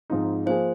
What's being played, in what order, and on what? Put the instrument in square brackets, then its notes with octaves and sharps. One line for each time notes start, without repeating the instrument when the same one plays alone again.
[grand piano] G#2 F3 C4 D#4
[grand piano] F3 A#3 G#4 [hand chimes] C5